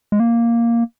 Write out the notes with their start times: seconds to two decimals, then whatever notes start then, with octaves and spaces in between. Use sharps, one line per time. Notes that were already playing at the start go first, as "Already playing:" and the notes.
0.12 G#3
0.20 A#3